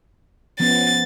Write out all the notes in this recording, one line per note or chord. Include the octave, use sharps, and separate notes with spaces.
F3 B3 C#4 A6